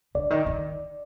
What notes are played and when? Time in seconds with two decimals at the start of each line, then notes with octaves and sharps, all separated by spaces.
0.15 D3 D5
0.30 D#3
0.46 D#3